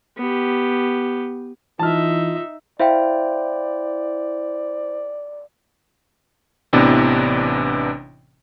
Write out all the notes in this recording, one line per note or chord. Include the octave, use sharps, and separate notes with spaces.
B3 G4
E3 D#4 F4 E5 A5 F6
E4 C5 D5 E5 F5 G5
A1 C3 E3 B3 D4